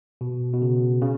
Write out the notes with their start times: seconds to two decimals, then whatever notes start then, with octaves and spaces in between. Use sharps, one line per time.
0.21 B2
0.53 B2
0.62 C#3
1.01 C#3